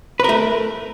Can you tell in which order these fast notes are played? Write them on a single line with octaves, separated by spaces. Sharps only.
B4 A#4 A3